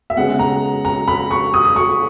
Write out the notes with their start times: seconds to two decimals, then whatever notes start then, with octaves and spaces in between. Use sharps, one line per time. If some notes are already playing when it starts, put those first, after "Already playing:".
0.10 E5
0.16 C#3 G#3 B3 F#5
0.39 A#5
0.85 A#5
1.08 B5
1.31 C#6
1.54 D#6
1.65 D#6
1.76 C#6